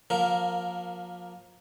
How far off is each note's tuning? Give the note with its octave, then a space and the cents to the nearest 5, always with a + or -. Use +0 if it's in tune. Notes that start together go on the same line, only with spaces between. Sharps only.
F3 +35 A#3 +10 A#4 +0